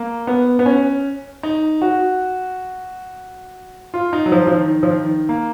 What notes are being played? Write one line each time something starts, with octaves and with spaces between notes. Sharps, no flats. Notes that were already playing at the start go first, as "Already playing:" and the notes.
Already playing: A#3
B3
B3
C#4
D#4
F#4
F4
D#4
F#3
F3
F3
D#3
F3
D#3
A#3